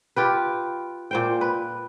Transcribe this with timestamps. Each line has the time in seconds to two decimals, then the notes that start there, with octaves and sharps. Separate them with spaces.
0.16 F4 G4 B4
1.11 A#2 C5 G5
1.41 B4